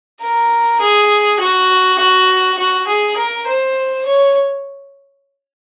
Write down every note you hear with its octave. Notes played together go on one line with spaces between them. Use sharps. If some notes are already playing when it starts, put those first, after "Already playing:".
A#4
G#4
F#4
F#4
F#4
G#4
A#4
C5
C#5